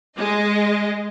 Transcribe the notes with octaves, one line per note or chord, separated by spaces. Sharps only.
G#3 D#5